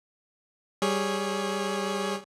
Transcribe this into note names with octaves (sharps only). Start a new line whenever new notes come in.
G3 G#4 C#5